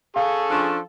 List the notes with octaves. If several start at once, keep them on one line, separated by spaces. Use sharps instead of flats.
G#4 A4 F5 C#6
F3 C#4 D4